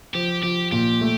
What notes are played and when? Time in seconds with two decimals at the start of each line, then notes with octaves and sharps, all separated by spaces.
0.14 F3 G4
0.43 F3 G4
0.72 A#2 G4
1.01 A3